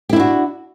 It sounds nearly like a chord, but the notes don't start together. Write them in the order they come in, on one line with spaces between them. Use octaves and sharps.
G4 E4 D4 F#4